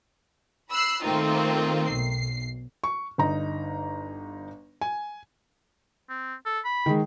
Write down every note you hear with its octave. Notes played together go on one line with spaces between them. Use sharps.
B5 E6 F#6 C7
D#3 A3 A#3 C4 D#4 F4
B1 C7
C#6
G1 D#4 A#5
G#5
C4
A4
B5
D#3 G#3